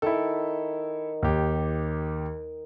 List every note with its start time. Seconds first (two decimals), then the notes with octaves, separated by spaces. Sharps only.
0.02 D#3 E4 A4
1.23 D#2 G4